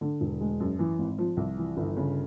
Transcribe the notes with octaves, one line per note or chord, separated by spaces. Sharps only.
D3
E1
G#3
F#2
E3
G#1
F3
C2
E3
G1
C#3